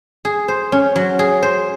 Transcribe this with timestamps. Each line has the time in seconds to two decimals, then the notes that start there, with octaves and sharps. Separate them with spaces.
0.25 G#4
0.48 C5
0.72 C#4
0.96 F#3
1.19 G#4
1.42 C5